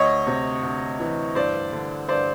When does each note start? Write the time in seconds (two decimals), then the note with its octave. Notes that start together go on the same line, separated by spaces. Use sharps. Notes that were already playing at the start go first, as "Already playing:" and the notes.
Already playing: D2 C#5 D#5
0.27 C3
0.63 D2
0.99 E3
1.35 G2 C5 D5
1.72 D3
2.08 G2 C5 D5